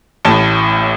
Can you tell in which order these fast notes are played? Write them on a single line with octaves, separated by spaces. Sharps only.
A1 A5 A2